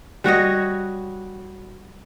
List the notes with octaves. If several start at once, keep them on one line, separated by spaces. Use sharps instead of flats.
G3 F#4 C#5 D#5